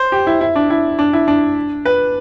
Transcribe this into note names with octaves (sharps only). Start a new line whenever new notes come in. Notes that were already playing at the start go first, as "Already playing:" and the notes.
Already playing: C5
G4
E4
E4
D4
E4
D4
E4
D4
B4